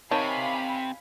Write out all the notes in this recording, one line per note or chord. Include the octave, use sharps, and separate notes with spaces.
C3 D#3 C#5 F5 G#5 A5 B5